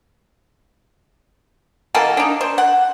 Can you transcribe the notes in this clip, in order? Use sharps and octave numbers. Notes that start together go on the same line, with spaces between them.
B2 E3 A#3 A4
D4 D#4
C5
F#5